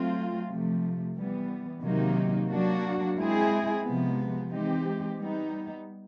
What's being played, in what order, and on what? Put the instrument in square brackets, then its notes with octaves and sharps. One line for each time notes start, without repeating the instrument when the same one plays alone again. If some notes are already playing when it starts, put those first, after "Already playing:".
Already playing: [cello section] F#3 A3 C4 F4
C3 F3 A3
E3 G3 B3
C3 D#3 F#3 A#3 D#4
F#3 A#3 D4 F#4
G#3 C4 E4 G#4
C3 F3 G#3 B3
E3 G#3 C4 D#4 G4
G3 B3 D#4